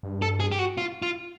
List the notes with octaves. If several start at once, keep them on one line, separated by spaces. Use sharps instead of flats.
G2
A4
G#4
G4
F#4
F4
F4